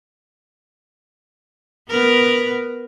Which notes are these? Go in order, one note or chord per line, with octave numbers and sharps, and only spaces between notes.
B3 A#4 B4